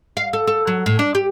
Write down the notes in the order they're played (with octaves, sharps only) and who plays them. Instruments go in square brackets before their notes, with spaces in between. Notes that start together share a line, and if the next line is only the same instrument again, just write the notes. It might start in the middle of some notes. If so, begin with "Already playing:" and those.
[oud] F5
A4
A4
F#3
A2
D4
G4